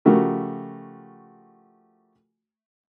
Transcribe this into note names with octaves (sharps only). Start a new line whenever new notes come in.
C#3 F3 A3 F#4 G4 A#4